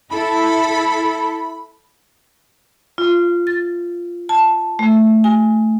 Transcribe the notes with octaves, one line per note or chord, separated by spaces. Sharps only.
E4 A4 B5
F4
A6
A5
A3
G#5